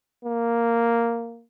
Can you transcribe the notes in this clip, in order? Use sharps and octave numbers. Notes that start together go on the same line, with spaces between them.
A#3